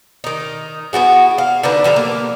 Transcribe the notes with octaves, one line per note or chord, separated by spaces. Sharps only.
D#3 D#4
B3 E4 F#4 G#4
F5
D3 D4 D#4 B4
D3 F3 G4 A#5
A#3